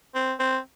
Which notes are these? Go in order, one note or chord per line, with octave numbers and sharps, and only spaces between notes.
C4
C4